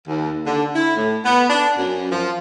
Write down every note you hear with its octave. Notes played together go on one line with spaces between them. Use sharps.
D#2
D3
E4
A2
B3
D4
F#2
F3